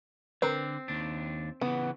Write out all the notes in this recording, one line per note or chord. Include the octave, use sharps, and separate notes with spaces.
D3 C4 A#4 B4
D#2 D4
C#3 E3 B3